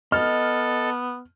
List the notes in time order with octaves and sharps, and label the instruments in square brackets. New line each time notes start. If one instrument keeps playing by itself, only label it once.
[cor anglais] B3 [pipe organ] A4 [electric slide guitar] D#5 [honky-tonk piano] F6